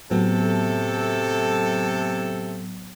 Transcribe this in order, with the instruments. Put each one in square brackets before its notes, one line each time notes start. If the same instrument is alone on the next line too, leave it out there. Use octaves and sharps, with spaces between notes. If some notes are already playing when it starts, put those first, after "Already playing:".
[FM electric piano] A2 F#3 B3 [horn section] C3 A3 A4